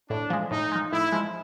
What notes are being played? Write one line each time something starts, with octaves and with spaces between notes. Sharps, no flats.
A2 D4
F3 G#3
A2 D#4
F3 G#3
A2 E4
F3 G#3